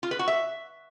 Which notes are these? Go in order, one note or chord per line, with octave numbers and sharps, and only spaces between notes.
F4
B4
F#4
E5